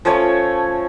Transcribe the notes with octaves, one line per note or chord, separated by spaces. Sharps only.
F3 A3 C#4 C#5